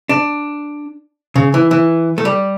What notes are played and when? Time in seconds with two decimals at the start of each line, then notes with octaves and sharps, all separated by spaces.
0.09 D4
1.36 C#3
1.54 E3
1.71 E3
2.18 A3
2.25 G3